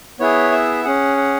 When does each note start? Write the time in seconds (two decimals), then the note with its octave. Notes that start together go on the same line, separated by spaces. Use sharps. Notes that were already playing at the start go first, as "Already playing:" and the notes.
0.20 B3 E4 G#4 C#5
0.52 E5
0.84 C#4 G#4 F#5
1.17 F#5